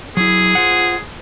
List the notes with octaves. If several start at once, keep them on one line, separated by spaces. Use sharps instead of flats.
F#3 E4 G#4
F4 C5 F#5